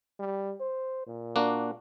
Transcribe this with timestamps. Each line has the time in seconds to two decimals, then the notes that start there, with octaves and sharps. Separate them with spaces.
0.20 G3
0.60 C5
1.07 A#2
1.36 A#3 D4 F#4